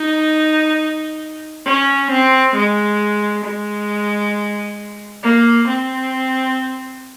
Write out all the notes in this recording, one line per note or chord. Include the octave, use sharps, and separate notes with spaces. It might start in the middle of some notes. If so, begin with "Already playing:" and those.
Already playing: D#4
C#4
C4
G#3
G#3
A#3
C4